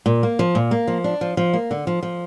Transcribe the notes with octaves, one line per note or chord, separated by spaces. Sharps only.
A#2
A#3
F3
A#2
A#3
F3
D4
F3
F3
A#3
D3
F3
F3